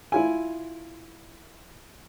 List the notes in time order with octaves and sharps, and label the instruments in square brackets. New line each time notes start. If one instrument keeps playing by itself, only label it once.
[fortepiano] E4 F4 G#5